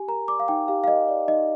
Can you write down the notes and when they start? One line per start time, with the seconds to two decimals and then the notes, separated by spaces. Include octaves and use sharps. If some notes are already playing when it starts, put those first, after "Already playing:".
Already playing: G4 G#5
0.08 A#4 A#5
0.28 D5 D6
0.40 F5
0.48 D#4 G5
0.68 G4 F5
0.84 F5
0.88 A#4 D#5
1.08 D5
1.28 D#4 D#5